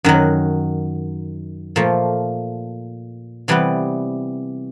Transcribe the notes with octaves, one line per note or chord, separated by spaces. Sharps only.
F#2 D#3 F#3
A#2 F3 A3
C3 E3 G3 B3